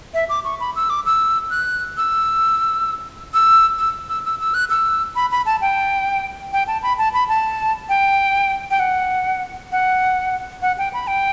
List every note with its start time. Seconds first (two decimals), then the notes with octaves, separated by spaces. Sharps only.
0.14 E5
0.29 D6
0.44 C#6
0.60 B5
0.76 E6
0.90 D6
1.06 E6
1.50 F#6
1.97 E6
3.34 E6
3.78 E6
4.09 E6
4.25 E6
4.40 E6
4.54 F#6
4.70 E6
5.16 B5
5.31 B5
5.46 A5
5.61 G5
6.53 G5
6.67 A5
6.83 B5
6.98 A5
7.14 B5
7.29 A5
7.89 G5
8.71 G5
8.80 F#5
9.72 F#5
10.62 F#5
10.78 G5
10.93 B5
11.07 G5